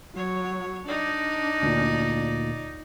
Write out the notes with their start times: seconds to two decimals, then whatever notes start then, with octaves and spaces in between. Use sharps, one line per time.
0.16 F#3 C#5
0.87 D4 D#4 D5
1.62 D2 A#2